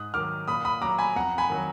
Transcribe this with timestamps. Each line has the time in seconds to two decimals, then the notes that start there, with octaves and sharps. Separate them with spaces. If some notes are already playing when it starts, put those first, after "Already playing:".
Already playing: G#2 D#6 F#6
0.14 D#3 F#3 D6 F6
0.48 A#2 B5 D#6
0.65 B5 D#6
0.82 F#3 A#5 D6
0.99 G#5 B5
1.16 F2 F#5 A#5
1.38 G#5 B5
1.50 D#3 F#3